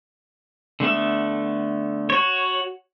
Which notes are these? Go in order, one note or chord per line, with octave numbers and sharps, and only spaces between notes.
D3 A3 B3 E5
F#4 C#5